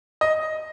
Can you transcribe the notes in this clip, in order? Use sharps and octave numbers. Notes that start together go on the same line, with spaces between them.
D#5